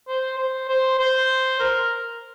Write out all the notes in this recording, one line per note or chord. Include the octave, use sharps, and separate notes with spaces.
C5
C5
C5
C5
A#4